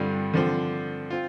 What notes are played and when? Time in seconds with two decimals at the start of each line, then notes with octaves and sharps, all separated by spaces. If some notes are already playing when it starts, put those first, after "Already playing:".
Already playing: G2 D3 G3 C4 F4
0.33 D3 F3 C4
1.10 C4 F4